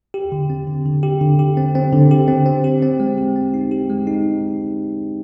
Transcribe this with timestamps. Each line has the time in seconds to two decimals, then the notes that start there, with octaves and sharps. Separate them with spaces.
0.14 G4
0.32 D3
0.50 C4
0.67 D3
0.85 D3
1.03 G4
1.21 D3
1.39 G4
1.57 C4
1.75 C4
1.93 D3
2.11 G4
2.28 C4
2.46 C4
2.64 G4
2.83 C4
3.00 G#3
3.18 G4
3.36 C4
3.54 D#4
3.71 G4
3.90 G#3
4.07 D#4